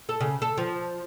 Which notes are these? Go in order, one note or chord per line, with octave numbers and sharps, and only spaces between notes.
A4
C#3
A4
F3